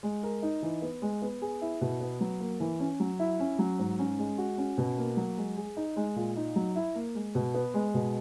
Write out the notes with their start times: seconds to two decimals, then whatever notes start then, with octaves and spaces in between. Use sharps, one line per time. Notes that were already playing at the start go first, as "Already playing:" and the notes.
0.03 G#3
0.23 A#4
0.43 D#4
0.62 E3
0.82 B3
1.02 G#3
1.22 B3
1.42 G#4
1.62 E4
1.81 B2
2.01 B3
2.21 F#3
2.40 A#3
2.60 E3
2.80 C#4
3.00 F#3
3.19 E4
3.40 C#4
3.59 F#3
3.79 G#2
3.99 C#4
4.19 G#3
4.38 F#4
4.58 C#4
4.78 B2
4.98 A#3
5.17 F#3
5.37 G#3
5.57 G#4
5.77 D#4
5.96 G#3
6.16 A#2
6.36 D#4
6.56 F#3
6.76 E4
6.95 A#3
7.15 G#3
7.35 B2
7.54 B3
7.74 G#3
7.94 B2